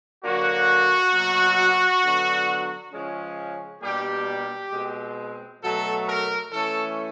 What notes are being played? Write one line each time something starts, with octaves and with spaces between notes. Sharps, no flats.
D3 F#3 A#3 D4 F#4
B2 F#3 A#3
D3 F#3 B3 D4
C#3 F3 G#3 C#4
B2 G3 A#3 D4 G4
B2 G#3 C4
B2 F#3 A3 A4
A#4
E3 A3 C#4 A4